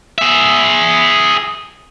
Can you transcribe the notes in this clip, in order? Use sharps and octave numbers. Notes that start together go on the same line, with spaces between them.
G#4 E5